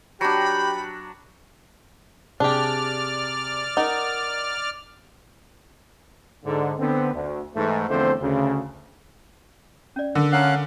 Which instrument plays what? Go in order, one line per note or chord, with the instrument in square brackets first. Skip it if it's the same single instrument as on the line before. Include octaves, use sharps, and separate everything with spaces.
[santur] F#3 D4 [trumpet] G4 [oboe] G5 [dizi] B5
[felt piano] C3 G#4 [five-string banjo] D4 G4 [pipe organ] D5 F6
[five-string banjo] D#4 [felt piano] A#4 F#5
[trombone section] G#2 D3
D3 B3 C4
D2
G#2 E3 A3
E2 D3 F3 A3 C4 C5
D2 C#3
[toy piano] C#4 D5
[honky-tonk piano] D3 [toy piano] A#4
[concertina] C#4 F5 F#6 [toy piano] F#5 A#5